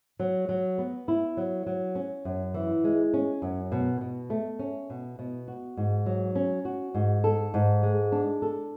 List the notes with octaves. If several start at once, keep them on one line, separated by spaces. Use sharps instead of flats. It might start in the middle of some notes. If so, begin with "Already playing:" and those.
F#3
F#3
B3
E4
F#3
F#3
C#4
F#2
E3
G#3
C#4
F#2
B2
B2
A3
C#4
B2
B2
F#4
G#2
F#3
C#4
F#4
G#2
A4
G#2
G#3
D4
A4